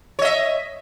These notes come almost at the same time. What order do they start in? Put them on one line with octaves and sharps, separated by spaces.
C#5 D#5 E5